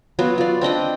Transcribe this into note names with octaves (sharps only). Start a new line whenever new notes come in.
F#3 B3 F4 F#4
F4 D5
C4 D4 D#5 G5